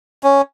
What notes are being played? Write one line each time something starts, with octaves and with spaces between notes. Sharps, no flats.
C#4